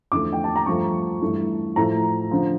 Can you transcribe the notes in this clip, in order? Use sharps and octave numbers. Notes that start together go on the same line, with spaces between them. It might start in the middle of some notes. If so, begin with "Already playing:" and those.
E2 D3 F3 A3 D6
G5
A5
A#5
G2 F3 A3 C#6
G2 E3 A3
A2 F3 A3 A#5
D3 F3